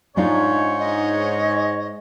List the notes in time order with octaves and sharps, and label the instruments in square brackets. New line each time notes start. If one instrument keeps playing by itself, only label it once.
[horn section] G#2 C#5 [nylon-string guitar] D4 D#4 F4
[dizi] D#5